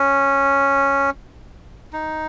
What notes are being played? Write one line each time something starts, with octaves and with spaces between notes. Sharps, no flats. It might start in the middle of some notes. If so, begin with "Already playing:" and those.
Already playing: C#4
D#4